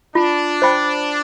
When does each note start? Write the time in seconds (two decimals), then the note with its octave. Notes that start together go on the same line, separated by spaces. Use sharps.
0.15 D4 F4
0.62 C5 G5 B5